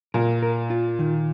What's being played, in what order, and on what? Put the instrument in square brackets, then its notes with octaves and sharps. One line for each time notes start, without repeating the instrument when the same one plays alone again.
[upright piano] A#2 [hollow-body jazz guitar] A#4
[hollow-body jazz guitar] A#4
F4
D#3